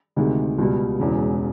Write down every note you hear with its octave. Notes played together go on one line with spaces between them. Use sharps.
D2 C3 D#3 G#3
C#2 B2 G3
E1 E2 C#3